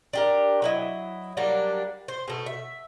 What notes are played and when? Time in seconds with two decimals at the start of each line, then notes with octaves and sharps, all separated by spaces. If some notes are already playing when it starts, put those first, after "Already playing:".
0.13 D4 G4 A#4
0.62 F#3 E4 D#5
1.37 F#3 G3 A#3 D4
2.08 C5
2.28 B2 A3
2.46 E5